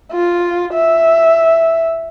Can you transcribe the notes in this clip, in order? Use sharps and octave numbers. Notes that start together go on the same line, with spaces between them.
F4
E5